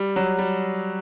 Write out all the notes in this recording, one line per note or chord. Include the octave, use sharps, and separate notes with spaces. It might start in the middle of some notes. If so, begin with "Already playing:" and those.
Already playing: G3
F#3
G3